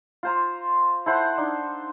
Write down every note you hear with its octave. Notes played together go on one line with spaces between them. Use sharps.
F4 C5 A#5
E4 A4 C5 F#5
D4 D#4